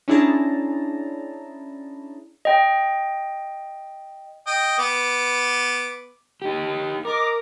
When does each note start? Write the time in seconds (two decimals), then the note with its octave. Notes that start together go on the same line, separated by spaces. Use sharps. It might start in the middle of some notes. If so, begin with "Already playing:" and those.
0.08 C#4 D4 E4 G#4 A5 A#5
2.45 D#5 G5
4.47 D#5 G5
4.79 B3 D6
6.42 D#4 G4
7.05 A#4 D#5 D6